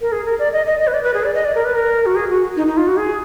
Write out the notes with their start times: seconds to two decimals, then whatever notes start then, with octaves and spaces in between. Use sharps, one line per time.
0.01 A#4
0.12 G#4
0.25 A#4
0.39 D5
0.53 D#5
0.66 D#5
0.80 D#5
0.87 B4
0.94 D5
1.04 B4
1.14 G#4
1.24 D5
1.34 D#5
1.45 D5
1.55 A#4
1.65 B4
1.75 A#4
2.06 F#4
2.15 G#4
2.30 F#4
2.56 D#4
2.67 D#4
2.77 F4
2.87 F#4
2.97 G#4